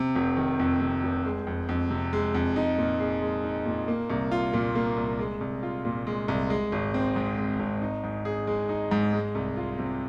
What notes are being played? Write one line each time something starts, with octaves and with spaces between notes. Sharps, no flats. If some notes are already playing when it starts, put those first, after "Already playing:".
Already playing: C3
F1
D#3
F2
C3
F1
G#3
F2
F2
C3
G#3
F2
D#4
A#2
G#4
G#3
D#4
A#2
A#3
C2
F4
A#2
A#3
C2
G#3
C2
F4
A#2
G#3
C2
G#3
G#1
C4
G#2
G#3
G#1
D#4
G#2
G#4
G#3
D#4
G#2
G#3
C2
F4
C3